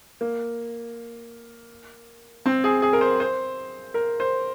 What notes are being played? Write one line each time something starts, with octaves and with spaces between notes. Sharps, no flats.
A#3
C4
G#4
G#4
A#4
C5
C5
A#4
C5